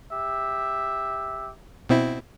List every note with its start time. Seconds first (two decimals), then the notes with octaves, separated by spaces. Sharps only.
0.13 G4 E5
1.89 B2 C4 E4